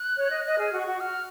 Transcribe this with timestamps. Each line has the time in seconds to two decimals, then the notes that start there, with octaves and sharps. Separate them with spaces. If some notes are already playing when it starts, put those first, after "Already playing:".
Already playing: F#6
0.16 C#5
0.30 D#5
0.45 D#5
0.58 G#4 F6
0.73 F#4
0.79 C#6
0.87 F#4
1.00 F#4 F6